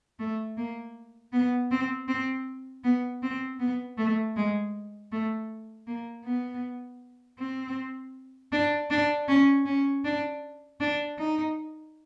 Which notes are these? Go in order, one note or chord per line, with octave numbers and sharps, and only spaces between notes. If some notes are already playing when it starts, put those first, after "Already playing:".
A3
A#3
B3
C4
C4
B3
C4
B3
A3
G#3
A3
A#3
B3
C4
D4
D4
C#4
C#4
D4
D4
D#4